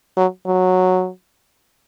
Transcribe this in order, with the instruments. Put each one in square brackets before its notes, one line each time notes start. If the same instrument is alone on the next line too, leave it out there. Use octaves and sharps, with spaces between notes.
[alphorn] F#3
F#3